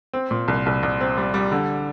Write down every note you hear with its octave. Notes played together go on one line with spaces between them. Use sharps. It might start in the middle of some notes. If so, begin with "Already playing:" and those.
C4
A#2
C2
C2
C2
C4
G3
G3
D3